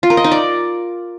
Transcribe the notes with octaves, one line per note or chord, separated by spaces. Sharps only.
F4
A#4
D#5
D#4
D5